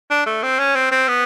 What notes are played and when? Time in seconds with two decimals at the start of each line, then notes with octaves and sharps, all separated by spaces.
0.11 D4
0.26 A3
0.43 C4
0.59 C#4
0.75 C4
0.92 C4
1.08 B3